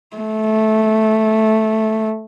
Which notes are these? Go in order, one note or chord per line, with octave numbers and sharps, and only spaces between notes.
A3